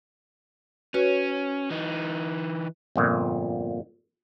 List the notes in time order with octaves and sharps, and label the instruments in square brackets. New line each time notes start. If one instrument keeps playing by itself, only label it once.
[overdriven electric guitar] C#4 [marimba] F#4 B4 C#5
[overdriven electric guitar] E3 D#4
[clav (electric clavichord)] G1 F2 A#2